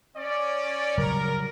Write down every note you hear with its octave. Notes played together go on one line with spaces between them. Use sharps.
C#4 D5
C#3 F#3 G3 A#4